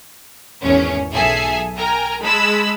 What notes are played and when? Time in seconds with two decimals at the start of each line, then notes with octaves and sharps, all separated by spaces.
0.62 G#1 E2 C#4
1.12 B1 G#4 A4 E5 G#5 C7
1.77 A#4 G5 G#5 A#5
2.22 G#3 A5 B5 E6